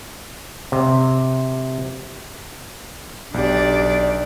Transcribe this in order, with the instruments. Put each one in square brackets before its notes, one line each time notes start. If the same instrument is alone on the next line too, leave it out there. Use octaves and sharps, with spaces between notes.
[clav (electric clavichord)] C3
[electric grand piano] B1 G4 [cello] D4 D5